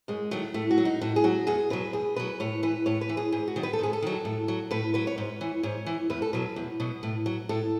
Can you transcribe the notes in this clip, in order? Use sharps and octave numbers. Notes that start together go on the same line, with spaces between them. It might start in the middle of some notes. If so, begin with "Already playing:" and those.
F#2 G#3
D#3 F#3 A3
A2 A3
F#4
F#3
D#4
A2 F#4
G#4
F#3 F#4
E2 G#4
B2 F#3 B4
E2 G#4
B2 F#3 B4
A2 C#5
E3 B4
A2 C#5
B4
E3
G#4
G#2 G#4
F#4
D#3 F#3
B4
A4
G#2 G#4
A4
D#3 F#3
A2
F#3
A2 B4
F#3 B4
C#5
G#2 B4
E3 C#5
G#2 C#5
E3
E2 B4
A4
B2 F#3 B4
E2
B2 F#3
A2
F#3
A2 A4